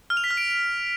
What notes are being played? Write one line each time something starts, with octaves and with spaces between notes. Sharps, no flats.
F6
F7
B6
F6
D7